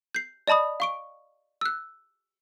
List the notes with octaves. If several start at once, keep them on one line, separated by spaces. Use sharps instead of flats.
G6 C7
D5 D#5 A5 B5 D#6
F5 C#6 D7
E6 F#6